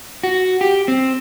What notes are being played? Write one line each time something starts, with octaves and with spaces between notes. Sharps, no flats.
F#4
G4
C4